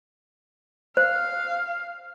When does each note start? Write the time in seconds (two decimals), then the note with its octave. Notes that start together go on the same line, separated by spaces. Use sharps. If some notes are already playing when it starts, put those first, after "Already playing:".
0.97 C5 F5